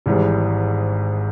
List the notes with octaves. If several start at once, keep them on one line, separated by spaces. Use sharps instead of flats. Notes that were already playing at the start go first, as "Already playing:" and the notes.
G#1 G#2 E3 G3